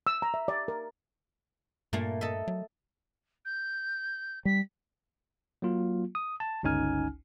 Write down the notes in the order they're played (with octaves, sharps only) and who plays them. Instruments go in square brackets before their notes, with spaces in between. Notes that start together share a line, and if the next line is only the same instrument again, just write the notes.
[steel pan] E6
A#5
E5
D5
A#4
[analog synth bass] G2 [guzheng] A#2 A3 A#3
[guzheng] A4 D#5 E5
[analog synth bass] F#3
[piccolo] G6
[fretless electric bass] G3 [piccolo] B6
[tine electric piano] F#3 A#3 F4
D#6
A5
G1 C#2 C#4 D#4 G#5 F6